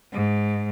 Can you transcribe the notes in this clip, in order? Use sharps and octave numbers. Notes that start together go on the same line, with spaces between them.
G#2